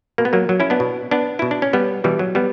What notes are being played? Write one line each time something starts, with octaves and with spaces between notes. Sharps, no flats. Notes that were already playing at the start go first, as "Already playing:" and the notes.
B2 A#3
B3
F#3 A#3
F#3
C#4 E4
B3 D4
B2
B3 D4
B2 E4
D4
C#4
G3 B3
B2 E3 G3
F#3
G3 B3